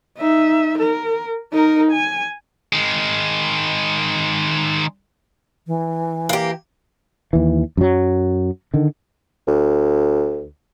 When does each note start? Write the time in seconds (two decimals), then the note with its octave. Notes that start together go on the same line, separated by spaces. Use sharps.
0.17 D#4 E5
0.79 A#4
1.52 D#4 A#4
1.92 G#5
2.73 D#3 G#3
5.67 E3
6.29 A#3 G4
7.33 D#2 E3
7.77 F#2 F#3
8.74 D3 D#3
9.47 D2